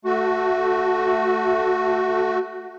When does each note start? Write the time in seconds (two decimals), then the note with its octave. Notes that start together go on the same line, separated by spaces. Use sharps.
0.05 A3 F#4